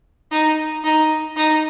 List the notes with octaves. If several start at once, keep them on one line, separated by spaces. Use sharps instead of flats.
D#4
D#4
D#4